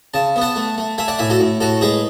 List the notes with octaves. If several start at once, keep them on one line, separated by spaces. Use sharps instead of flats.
C#3 A5
B3
F#5 A5
A3
A3
A3 E5 G#5
D5 F#5
A2 E5 G#5
F#4 A4
A2
A2 F#4 A4
G#3 G#4 B4